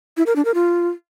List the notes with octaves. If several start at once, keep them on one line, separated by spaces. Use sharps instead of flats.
E4
A#4
D4
A#4
F4